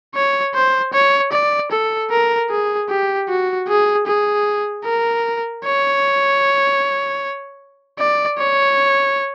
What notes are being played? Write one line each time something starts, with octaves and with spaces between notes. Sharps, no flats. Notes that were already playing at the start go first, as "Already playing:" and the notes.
C#5
C5
C#5
D5
A4
A#4
G#4
G4
F#4
G#4
G#4
A#4
C#5
D5
C#5